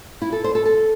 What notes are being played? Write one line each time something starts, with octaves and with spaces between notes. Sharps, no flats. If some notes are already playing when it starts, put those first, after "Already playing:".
E4
A4
C5
A4
A4